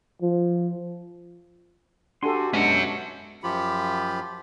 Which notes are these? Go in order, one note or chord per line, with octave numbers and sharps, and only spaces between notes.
F3
D4 F#4 G4 A4 G#5 C6
B2 G#3 C#4 D4 F#4 E5 A5 C#6
F#2 F3 F4 G4 B5